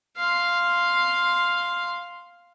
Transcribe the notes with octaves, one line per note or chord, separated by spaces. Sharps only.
F5 C6